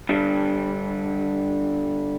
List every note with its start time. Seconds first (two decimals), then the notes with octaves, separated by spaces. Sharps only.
0.09 G2 D3 G3